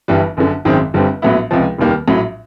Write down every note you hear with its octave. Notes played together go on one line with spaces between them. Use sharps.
G1 G2 E3 G3
G1 F#2 D3
G#1 F#2 D#3 G#3 C4
G1 G2 D3 G3 C4
A#1 A2 F#3 B3 E4
C#2 C3 F3
F1 D#2 D#3 G3 A#3
A#1 A2 F#3